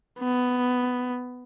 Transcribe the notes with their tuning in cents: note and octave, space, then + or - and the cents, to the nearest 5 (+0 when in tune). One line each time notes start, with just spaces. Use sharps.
B3 +10